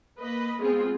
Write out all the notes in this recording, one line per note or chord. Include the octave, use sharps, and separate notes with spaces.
A#3 B4 D#5
G#3 B3 C4 F4 G#4